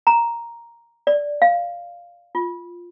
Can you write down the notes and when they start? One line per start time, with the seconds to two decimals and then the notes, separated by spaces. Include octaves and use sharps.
0.07 A#5
1.07 D5
1.42 F5
2.35 F4